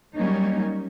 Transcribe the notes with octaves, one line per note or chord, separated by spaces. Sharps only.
F#3 G3 A#3 C#4 D#4